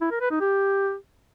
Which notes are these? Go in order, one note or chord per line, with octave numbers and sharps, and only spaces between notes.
E4
A#4
B4
D#4
G4